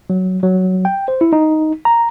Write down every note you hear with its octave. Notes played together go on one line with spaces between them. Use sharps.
F#3
F#3
G5
C5
E4
D#4
A#5